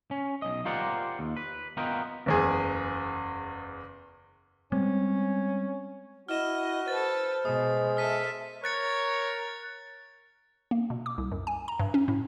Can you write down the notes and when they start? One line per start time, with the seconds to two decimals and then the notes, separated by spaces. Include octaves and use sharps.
0.11 C#4
0.42 B1 D#5
0.65 F4 G4 A#4 C5 D5 F#5
1.19 D#2
1.37 B4
1.77 B3 F4 A#4 B4 D#5 G5
2.26 F#1 E2 G#4
4.72 G3 G#3 C4 C#4
6.29 E4 F#4 D#5 F6 E7
6.88 A4 B4 C5 A6
7.45 B2 G#3 D#6
7.97 A4 E5 F6 B6 D#7
8.64 A#4 C#5 F#6 A6 C#7
10.71 A#3
10.90 B2
11.06 D6
11.18 C2
11.32 F#2
11.47 G#5
11.68 A#5
11.79 G2
11.94 C#4
12.08 A2